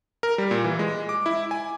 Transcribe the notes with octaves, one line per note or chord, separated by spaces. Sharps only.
A#4
G3
A#2
E3
G#3
D6
E4
G#5